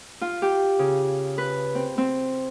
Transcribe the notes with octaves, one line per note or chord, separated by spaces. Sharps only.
F4
G4
C#3
B4
C4
C4